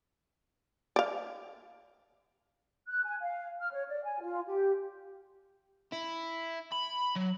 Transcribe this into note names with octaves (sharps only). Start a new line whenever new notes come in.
D5 F5
F#6
G#5
F5
F6
C#5
D5
G#5
F4
G4
E4
B5
F#3